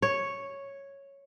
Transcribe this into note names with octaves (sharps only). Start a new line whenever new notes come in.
C#5